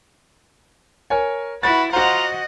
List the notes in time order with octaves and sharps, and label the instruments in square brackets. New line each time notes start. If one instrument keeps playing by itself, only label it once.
[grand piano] A#4 C#5 G#5
[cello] E4 [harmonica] F#4 B4 [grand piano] A6
[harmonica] F4 A#5 [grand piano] F#4 C5 [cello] D#5 F#5